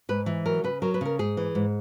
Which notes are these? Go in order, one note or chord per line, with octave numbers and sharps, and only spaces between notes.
G#2 B4
E3
F#3 A#4
C#3 B4
F#3 A#4
B4
C#3 A#4
G#2 G#4
E3
G#2